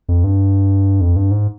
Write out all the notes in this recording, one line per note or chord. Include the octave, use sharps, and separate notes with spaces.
F2
G2
F2
G2
G#2